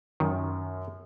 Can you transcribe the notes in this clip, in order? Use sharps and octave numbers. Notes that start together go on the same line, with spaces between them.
F#2 D#3